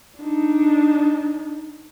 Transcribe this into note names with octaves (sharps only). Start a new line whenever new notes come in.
D4 D#4